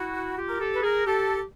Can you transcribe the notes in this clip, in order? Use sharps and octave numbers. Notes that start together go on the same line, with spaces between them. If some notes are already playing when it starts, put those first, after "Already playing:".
Already playing: E4 F#4
F4 G4
A#4
G4 A4
B4
G#4 A#4
G4 A4